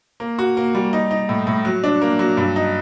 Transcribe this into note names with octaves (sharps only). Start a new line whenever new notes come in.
A#3
F#4
A#3
G3
D#4
D#4
A2
A2
F#3
D4
A#3
F#3
G2
D#4